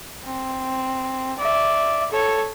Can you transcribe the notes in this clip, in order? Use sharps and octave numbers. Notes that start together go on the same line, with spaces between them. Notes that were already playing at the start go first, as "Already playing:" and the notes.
C4
D5 E5
A4 C#5